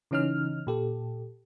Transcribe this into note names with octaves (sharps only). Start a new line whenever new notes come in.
C#3 E3 C#4 D#4 F6
A#2 G4 A4